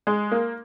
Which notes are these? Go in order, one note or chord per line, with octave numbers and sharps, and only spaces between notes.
G#3
A#3